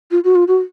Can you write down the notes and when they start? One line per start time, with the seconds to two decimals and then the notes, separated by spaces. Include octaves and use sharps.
0.11 F4
0.24 F#4
0.36 F4
0.48 F#4